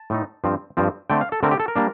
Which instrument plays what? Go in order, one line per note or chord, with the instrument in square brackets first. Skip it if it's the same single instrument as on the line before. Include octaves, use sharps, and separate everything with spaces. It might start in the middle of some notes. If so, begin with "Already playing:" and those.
Already playing: [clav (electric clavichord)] A5
A2 A3 D#4
G2 F3 C4
G2 F3 C4
D3 A3 C4 G5
F5
A4
D3 A3 C4 A#4
G4
A4
A#4
G3 A#3 D4